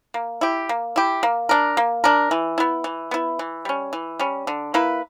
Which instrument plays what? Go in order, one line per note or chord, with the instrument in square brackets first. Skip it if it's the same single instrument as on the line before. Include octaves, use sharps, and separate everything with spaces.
[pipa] A#3
E4 G4
A#3
E4 G4
A#3
D4 A#4
A#3
D4 A#4
E3
B3 E4
E3
B3 E4
E3
G3 C#4
E3
G3 C#4
D3
A#3 E4 B4